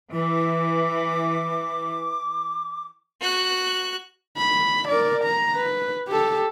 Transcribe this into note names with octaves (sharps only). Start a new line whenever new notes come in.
E3 D6
F#4 F#6
B5
A#4 D5
A#5
B4
G4 A4